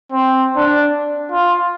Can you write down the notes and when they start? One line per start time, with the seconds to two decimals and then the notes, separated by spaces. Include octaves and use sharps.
0.12 C4
0.56 D4
1.31 F4